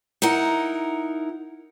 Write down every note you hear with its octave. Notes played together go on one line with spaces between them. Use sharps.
D#4 E4 A#4 F#5